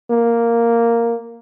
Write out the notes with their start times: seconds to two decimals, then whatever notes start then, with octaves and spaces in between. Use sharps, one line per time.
0.10 A#3